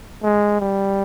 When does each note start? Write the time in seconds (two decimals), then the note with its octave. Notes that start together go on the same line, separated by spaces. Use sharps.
0.23 G#3
0.60 G3